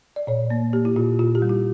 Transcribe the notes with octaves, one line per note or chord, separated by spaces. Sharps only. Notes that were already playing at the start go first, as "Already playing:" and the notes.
D5
A#2 C#5
A#3
A#3 G4
E4
A#2 F4
A#2 F4
G4
G3
E4